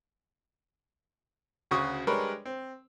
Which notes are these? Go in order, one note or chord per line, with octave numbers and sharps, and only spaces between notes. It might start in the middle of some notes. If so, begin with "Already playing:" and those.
D2 C#3 F#4 C#6 D#6
G3 G#3 D4 A#4 B4 C#5
C4